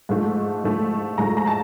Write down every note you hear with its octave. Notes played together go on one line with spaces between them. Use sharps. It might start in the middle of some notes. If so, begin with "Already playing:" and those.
G#2 F3 A3
G#2 F3 A3
G#2 F3 A3 A#5
A#5
A5